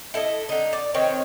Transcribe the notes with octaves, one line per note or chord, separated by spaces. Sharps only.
E4 A4 C#5 D#5
D3 D#4
D5
D#3 C4 C#5